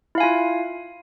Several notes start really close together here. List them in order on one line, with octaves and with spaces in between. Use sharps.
E4 F5 G#5 F4